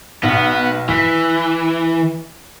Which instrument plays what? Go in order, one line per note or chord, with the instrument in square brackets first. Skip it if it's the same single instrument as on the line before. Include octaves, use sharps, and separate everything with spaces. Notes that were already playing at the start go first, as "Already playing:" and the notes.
[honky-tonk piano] B1 [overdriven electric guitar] B3
[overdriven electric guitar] E3 [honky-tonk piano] B6